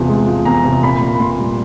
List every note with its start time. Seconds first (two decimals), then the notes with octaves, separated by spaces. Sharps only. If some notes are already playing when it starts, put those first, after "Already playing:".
Already playing: E2 C3 F3
0.09 G#3
0.27 F3
0.45 E2 A#5
0.65 C3
0.83 A#2 B5
1.01 A#3 B5
1.20 A#2 C6
1.39 G3